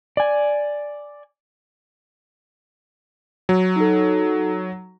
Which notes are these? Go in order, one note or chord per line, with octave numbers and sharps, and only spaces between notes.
D5 G#5
F#3
D#4 A4